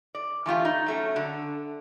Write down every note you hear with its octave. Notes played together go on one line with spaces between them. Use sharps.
D5
E3 A3 F4 G4
D#4
F#3 A3 C#4
D3